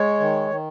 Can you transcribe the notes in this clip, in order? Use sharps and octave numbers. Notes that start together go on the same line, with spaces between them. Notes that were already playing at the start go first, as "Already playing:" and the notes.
Already playing: G#3 C#5
D#3
D#3